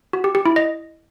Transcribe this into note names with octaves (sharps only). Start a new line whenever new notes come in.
F#4
G4
G4
E4
D#5